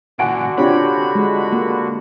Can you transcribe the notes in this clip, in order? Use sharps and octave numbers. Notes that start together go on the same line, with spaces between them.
A#2 D3 E3 F#4 F#5 G#5 D7
C4 D4 F4 G4 C#5 B5
G#3
A#3